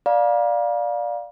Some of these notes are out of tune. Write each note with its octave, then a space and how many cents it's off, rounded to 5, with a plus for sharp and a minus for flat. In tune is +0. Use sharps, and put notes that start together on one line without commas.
D5 +0 F5 +15 A#5 +45